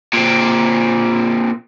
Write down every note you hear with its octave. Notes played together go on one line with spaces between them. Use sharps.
A#2 C4